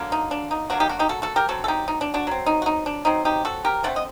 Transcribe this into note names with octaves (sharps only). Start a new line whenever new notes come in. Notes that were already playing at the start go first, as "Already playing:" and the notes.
Already playing: D3 F#3 A#3
D#4
D4
D#4
F#3 A#3 D4 F#4
D#4 G4
D4 F#4
D#4 G4
F#4 A4
F#4 A4
G4 A#4
D3 F#3 C4 F#4 A4
A4
D#4 G4
D#4
D4
D4 F#4
F#3 C4
D#4
F#4
D#4
D4
F#3 C4 D#4
D#4 G4
F#4 A4
G4 A#4
D3 A3 C4 D5 F#5
D#5